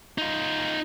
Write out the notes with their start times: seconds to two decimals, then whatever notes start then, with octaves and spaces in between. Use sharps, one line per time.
0.18 D#4 F4